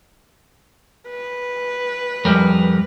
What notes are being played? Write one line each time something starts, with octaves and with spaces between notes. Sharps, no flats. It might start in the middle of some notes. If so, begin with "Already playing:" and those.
B4
F2 G3 A#4